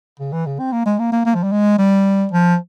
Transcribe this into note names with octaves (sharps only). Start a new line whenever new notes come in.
C#3
E3
C#3
C4
A#3
G#3
A#3
A#3
A#3
F3
G3
G#3
G3
F3